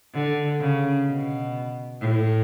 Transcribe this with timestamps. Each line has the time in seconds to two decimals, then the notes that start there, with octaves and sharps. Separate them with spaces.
0.14 D3
0.60 C#3
1.06 B2
2.00 A2